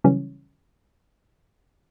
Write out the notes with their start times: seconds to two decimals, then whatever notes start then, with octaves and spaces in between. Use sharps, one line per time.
0.04 C#3 E3 F#3 G3 C#4